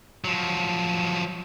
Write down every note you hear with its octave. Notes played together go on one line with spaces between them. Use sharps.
F3 F#3